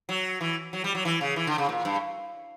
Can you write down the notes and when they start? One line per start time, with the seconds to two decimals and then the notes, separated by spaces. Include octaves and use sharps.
0.09 F#3
0.41 E3
0.73 F#3
0.84 G3
0.95 F#3
1.05 E3
1.21 C#3
1.36 E3
1.47 D3
1.58 C#3
1.69 A#2
1.85 G2